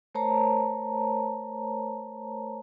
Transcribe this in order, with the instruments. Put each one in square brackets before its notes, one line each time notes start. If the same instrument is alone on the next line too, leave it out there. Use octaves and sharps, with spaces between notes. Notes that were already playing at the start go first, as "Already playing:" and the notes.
[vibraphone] A3 A#4 C5 C#5 A5 A#5